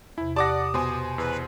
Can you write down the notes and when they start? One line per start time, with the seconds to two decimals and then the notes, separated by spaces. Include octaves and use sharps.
0.18 E2 C3 E4
0.36 G4 D5 F#5 A5 D6 D#6 A#6
0.74 B2 C5 G#5
1.18 E2 B4